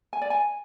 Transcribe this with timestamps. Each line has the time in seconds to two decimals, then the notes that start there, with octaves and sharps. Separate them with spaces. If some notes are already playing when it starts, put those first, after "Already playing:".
0.13 G#5
0.22 D5
0.30 G#5